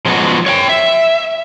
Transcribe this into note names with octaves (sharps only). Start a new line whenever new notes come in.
F3 F#3 G#3 B3 D4 F#4
C#5 F5 G5
E5